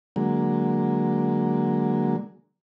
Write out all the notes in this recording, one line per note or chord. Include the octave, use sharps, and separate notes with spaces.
D3 F#3 G#3 A#3